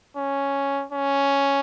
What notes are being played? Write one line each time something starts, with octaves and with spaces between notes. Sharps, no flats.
C#4
C#4